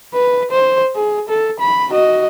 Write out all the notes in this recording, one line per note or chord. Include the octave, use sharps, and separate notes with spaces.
B4
C5
G#4
A4
B5
F#4 D#5